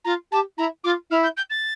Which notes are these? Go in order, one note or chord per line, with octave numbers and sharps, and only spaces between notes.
F4 A#5
G4 A5
E4 A#5
F4 D6
E4 F6
G6
G6
A6